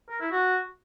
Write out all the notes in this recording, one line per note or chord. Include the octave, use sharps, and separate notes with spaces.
A#4
E4
F#4